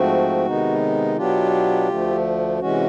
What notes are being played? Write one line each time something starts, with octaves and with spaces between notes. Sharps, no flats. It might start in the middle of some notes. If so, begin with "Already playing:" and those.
Already playing: G#2 F3 A3 C4 F#4
C3 D#3 G#3 B3 D#4
B2 F#3 B3 D4 F4 G4
D2 D3 F3 A3
C3 E3 G#3 C#4 F#4